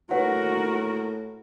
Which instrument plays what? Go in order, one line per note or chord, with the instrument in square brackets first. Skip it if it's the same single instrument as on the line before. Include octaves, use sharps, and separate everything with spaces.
[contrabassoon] A2 [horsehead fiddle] F#4 A#4 [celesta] B4 C#5 F#5